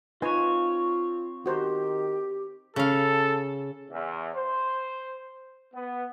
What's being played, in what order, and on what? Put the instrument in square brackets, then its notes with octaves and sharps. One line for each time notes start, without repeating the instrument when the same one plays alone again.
[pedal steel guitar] C4 C#5 [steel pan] D#4 B4 G#5 [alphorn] F4
[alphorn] D#3 [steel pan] F#4 C5 A#5 [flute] G4
[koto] C#3 F5 [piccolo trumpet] A4
[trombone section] E2
C5
B3